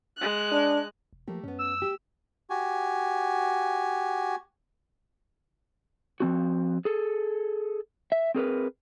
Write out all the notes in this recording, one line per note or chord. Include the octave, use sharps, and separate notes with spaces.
G#3 F#6
D4
E1
F3 A3 A#3 G4
F#2 B3 C#4
E6
G4
F#4 G4 G#5
F3 C4 F#4
G#4 A4
E5
C4 G#4 A#4 B4